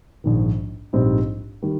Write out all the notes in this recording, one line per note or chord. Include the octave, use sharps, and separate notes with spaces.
A#1 G#2 D#3
A#1 G#2 G3 C4 D#4
D#3 G3